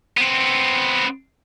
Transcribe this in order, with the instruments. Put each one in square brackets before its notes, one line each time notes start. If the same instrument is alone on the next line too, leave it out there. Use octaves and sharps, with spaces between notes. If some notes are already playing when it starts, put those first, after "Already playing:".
[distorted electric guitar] B3 C4